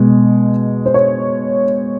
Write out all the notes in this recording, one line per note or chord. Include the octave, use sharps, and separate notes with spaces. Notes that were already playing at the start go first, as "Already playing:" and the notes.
Already playing: B2 G#3
C5
C#5